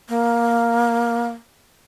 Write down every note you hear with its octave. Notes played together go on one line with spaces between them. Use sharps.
A#3